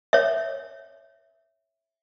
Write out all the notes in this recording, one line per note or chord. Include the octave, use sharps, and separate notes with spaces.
C#5 E5